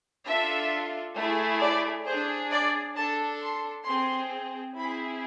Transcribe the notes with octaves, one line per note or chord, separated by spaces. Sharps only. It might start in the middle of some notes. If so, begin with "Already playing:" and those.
D4 F4 A4 E5
A3 E4 G#4
D5
D4 G#4 C5
D5
D4 A4 A5
C6
C4 G#4 C6
C4 E4 G#4 B5